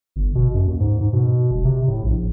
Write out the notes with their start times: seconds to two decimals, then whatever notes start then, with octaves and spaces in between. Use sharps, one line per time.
0.16 G1
0.35 B2
0.54 F#2
0.67 D#2
0.80 G#2
1.01 G#2
1.13 B2
1.51 E1
1.65 C3
1.88 A2
2.04 A#1